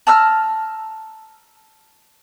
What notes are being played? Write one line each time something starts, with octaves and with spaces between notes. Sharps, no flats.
A5 A#5 E6 F6